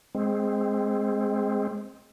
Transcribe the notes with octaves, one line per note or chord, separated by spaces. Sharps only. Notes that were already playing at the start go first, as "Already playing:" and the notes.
G#3 C4